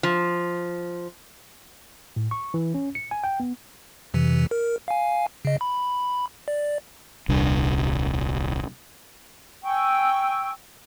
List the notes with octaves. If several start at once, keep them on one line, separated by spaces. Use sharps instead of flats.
F3
A2
C#6
E3
C#4
C#7
G#5
G5
B3
F2 C3 E3
A#4
F5 G#5
C#3 D#5
B5
D5
D#1 C2 G3 D4
G5 G#5 C#6 E6